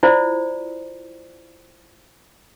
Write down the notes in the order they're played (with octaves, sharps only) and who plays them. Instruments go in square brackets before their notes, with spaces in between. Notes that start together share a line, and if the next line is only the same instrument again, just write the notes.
[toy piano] E4 F4 C5 D5